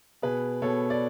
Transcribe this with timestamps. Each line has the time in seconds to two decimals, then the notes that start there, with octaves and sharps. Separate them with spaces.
0.22 B2 G#4 B4
0.62 B2 A4 C#5
0.90 D5